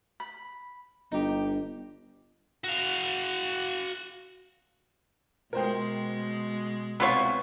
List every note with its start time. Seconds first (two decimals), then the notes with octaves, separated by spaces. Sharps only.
0.20 B5
1.12 G1 D#4 G4
2.64 F#4 F5
5.53 B2 G#3 A#4 C5 G5
7.00 C2 B3 F4 C#5